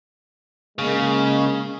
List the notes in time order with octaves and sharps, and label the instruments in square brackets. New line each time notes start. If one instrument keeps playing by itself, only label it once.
[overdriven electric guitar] C#3 [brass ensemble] G#3 A#3